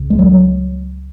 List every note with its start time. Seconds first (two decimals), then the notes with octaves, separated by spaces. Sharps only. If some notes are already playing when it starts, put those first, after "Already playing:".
Already playing: C#2 C#3
0.10 G#3
0.19 F#3